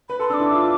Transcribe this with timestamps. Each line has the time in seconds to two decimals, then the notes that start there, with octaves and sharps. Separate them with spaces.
0.09 B4 B5
0.20 A4 C6
0.29 D4 E6
0.34 D6
0.40 E4
0.51 E4
0.55 F4